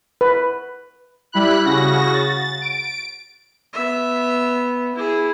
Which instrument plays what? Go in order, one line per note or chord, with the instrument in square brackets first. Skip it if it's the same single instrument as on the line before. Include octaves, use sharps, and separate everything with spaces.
[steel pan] B4
[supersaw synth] G3 E4 B5 F#6
C#3 F#4 A#6
A6
D7
[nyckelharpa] B3 E5
E4 G#4